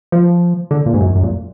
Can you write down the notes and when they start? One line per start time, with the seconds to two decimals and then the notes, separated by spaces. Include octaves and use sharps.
0.12 F3
0.71 D3
0.86 A#2
0.94 G#2
1.01 F#2
1.15 F#2
1.23 A#2